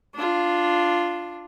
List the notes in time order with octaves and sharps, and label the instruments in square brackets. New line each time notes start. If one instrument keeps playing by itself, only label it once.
[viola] D4 F4